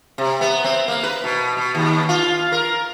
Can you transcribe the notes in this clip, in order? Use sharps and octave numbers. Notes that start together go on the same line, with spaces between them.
C3
B3
C4
A#3
B4
B2
B2
D#2
F4
A#4